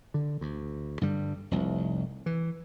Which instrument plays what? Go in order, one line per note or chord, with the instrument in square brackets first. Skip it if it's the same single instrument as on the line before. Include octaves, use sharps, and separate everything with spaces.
[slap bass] D3
D2
G2 D3 G3
F1 C2
E3